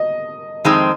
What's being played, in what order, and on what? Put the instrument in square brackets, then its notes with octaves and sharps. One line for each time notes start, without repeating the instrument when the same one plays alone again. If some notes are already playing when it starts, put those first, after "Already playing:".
Already playing: [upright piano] D#5
[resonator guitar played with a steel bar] F2 D#3 G#3 C4 D#4